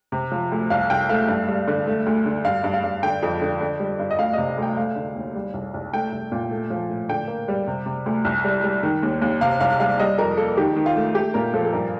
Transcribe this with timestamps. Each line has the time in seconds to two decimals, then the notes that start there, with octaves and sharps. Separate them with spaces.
0.12 C3
0.32 F3
0.52 D2
0.70 C2 F5
0.90 C2 G5
1.09 A3 F5
1.28 G2
1.48 G3
1.67 D3
1.87 A3
2.06 D2
2.25 D3
2.44 G2 F5
2.64 G2
2.74 F5
2.83 G2
3.03 D3 G5
3.23 F2
3.41 D3
3.60 D3
3.80 G3
3.99 G2
4.11 D#5
4.19 D2 F5
4.33 C3 D#5
4.58 D2 G5
4.77 A3 F5
4.96 D3
5.16 D#2
5.35 G3
5.54 C2
5.74 C2
5.93 A3 G5
6.12 C2
6.32 A#2
6.51 A3
6.70 F3
6.89 A2
7.09 D3 G5
7.28 A#3
7.48 G3
7.67 C3
7.86 C3
8.06 D2
8.25 C2
8.44 G3
8.64 G3
8.83 D#3
9.03 D#2
9.22 D#2
9.41 C3 F5
9.61 C2 F5
9.80 G3 F5
10.00 G3 D#5
10.18 F2 A#4
10.37 A#3 A4
10.57 D#3 G4
10.77 D#3
10.86 F4
10.96 A3
11.15 A3 G4
11.34 A#2 A#4
11.54 F3 A4
11.65 A4
11.73 G2 A#4